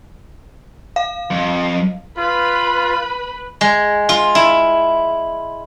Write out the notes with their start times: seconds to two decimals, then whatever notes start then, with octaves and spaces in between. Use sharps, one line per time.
0.96 F5
1.31 F2
2.18 F4 B4 B5
3.61 G#3
4.09 F4
4.35 E4